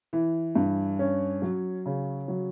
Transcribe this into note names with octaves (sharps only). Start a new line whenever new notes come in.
E3
G2
C#4
F#3
C#3
F#3